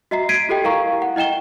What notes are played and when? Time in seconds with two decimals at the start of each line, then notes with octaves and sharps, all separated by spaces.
0.11 F#4 D#5 E5 A#5 C7
0.29 G#6 B6 C7 D7 D#7
0.49 F4 G4 A4 D#5 G5
0.64 E4 A#4 F5 A#5 C#6
1.02 F#5
1.16 E4 D#5 G5 E7 G7